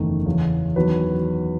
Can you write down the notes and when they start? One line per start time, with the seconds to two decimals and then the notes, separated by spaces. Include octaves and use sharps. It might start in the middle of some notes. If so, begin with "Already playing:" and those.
Already playing: F#1 E2 D#3 A3
0.26 E2 C#3 E3
0.76 E2 D#3 F#3 B4